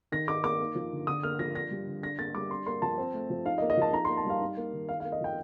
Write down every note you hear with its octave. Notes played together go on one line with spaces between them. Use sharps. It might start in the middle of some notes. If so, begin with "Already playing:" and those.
D#3 A#6
D#4 D6
A#3 D6
A#3
F3
D3
D3 D#6
A#3 F6
F3 A#6
D4 A#6
G3
D3
D4 A#6
A#3 A6
G3 D6
D4 C6
A#3 C6
F3 A5
C4
A3
F3
D#4 F5
D#5
A#3
D#5
F3 A5
D#4 A#5
A#3 C6
A5
G3 F5
D#4
A#3
D#3
D#4 F5
A#3 F5
D#5
F3 G5